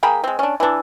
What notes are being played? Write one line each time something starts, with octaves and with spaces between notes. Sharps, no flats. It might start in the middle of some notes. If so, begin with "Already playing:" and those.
A#3 G#4 G5 B5
G#3 C4
C#4 D4
E3 D4